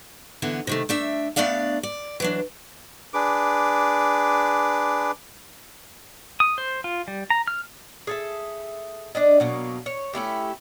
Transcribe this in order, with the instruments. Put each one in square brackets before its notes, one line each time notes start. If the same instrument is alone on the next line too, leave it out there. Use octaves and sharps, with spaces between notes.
[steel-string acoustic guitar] D3 E3 B3
C3 D#3 A3
A3 D4 E5
A3 B3 D4 D5 F5
D5
E3 F#3 D4
[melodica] D4 G#4 B4 D6
[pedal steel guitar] D#6
C5
F4
G3
A#5
F6
[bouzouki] G#4 A4 E5
D4 D5 D#5
B2 F#3 A#3
C#5
A3 C#4 E4 G4